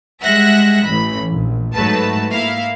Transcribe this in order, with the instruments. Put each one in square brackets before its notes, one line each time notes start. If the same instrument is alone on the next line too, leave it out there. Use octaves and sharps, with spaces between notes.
[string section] G3 G#3 E5 F#5 F#6 A#6
A1 E3 B5
A#1
G#2 F#3 A3 B4 A5
A#3 E4 F5